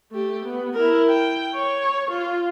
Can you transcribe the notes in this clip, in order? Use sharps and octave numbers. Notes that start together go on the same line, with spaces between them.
A3 G4
B3
E4 A#4
G5
C#5
F4